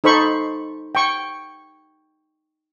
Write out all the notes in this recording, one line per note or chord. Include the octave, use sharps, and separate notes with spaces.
D#4 A4 C5 B5 C#6
G5 C#6